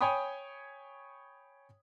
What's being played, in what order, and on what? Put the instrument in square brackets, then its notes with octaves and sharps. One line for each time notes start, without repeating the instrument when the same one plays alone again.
[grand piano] C#5 G5 G#5 B5 D#6